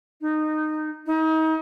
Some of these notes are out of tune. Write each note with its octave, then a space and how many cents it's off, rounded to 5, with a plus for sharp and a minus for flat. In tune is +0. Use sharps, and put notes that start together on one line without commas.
D#4 -15
D#4 +35